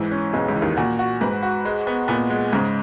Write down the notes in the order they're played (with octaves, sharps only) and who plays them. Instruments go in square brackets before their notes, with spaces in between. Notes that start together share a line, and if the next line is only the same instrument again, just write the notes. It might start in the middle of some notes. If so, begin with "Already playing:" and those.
Already playing: [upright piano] G#2 [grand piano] E3
[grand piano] C#4
[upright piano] B1 B2 [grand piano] G#3
[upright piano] C#2 C#3
[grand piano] E3
[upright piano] D#2 D#3
[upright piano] A#2 [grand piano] F#4
[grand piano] F#4
[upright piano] G#2 [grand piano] B4
[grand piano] F#4
G#3
B3
[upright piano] A#2 [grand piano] B3
[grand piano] G#3
[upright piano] G#2 [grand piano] C#3